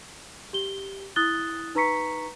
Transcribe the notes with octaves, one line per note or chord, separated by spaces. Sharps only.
G4 G7
E4 D#6 F#6 A6 G7
D#4 B4 A#5 C#6 B6 C#7